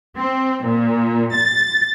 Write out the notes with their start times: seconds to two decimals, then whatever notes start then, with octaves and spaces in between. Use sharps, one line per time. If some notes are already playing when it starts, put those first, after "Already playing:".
0.16 C4
0.65 A#2
1.34 A6